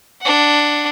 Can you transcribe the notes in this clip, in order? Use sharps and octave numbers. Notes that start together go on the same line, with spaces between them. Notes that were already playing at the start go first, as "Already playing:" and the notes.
D4 F#5